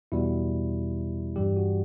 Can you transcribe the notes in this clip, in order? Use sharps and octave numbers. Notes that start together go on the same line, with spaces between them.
E2 B2 G3 E4
G2 E3 G3 G4
F#4